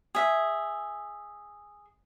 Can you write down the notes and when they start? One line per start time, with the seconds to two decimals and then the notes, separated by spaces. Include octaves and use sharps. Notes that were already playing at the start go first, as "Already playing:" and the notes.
0.15 G#4 E5